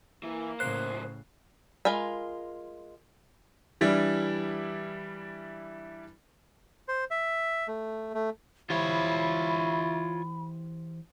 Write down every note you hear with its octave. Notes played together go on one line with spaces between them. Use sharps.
E3 A#3
B1 A2 C#3 C5 F#6 C7
G#3 F4 A#4 G#5 B5
E3 G3 D4 E4
C5
E5
A3
A3
E3 E4 F4 G4 C5 C#5 B5